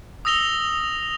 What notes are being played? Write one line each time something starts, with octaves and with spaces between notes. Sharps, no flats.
D#6 E6 A#6 F7 G7